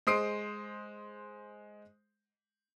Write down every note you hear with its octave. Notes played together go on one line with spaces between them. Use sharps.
G#3 C5 D#6 C7 D7